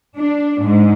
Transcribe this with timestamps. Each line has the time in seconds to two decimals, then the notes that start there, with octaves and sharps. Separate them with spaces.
0.17 D4
0.61 G#2